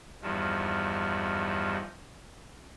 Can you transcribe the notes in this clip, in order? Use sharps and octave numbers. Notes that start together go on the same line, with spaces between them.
E2 G2 D#3 F3